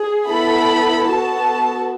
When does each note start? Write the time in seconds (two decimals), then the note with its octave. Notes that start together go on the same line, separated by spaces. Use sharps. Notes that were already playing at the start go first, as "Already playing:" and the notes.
Already playing: G#4
0.29 B3 E4 A4 B5
1.07 B3 F#4 A4 A5